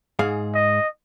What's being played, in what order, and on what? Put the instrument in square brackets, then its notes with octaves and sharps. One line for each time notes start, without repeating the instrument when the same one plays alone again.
[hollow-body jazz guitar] G#2 G#4 F5
[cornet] D#5